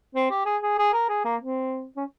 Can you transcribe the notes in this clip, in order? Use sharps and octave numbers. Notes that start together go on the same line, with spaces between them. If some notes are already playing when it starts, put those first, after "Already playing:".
C4
G4
G#4
G#4
G#4
A#4
G#4
A#3
C4
C#4